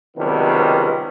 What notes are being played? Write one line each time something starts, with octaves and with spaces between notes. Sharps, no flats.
C#2 C3 D#3 F#3 G3 B3